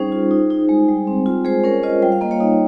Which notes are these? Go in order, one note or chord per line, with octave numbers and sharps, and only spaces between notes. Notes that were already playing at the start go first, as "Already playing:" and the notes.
Already playing: G3 C#4 D#4 G#4 C5
F4
D#4
D#4
G#3
G3
C4
F4
G#3 G#4 C5
C#4 A#4 C#5
F4 C5 D#5
G3 G5
F5
A#3 D#5
C#5 F5
D#4